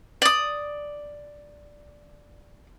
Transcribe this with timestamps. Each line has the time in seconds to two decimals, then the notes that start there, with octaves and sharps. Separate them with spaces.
0.22 D5 D#6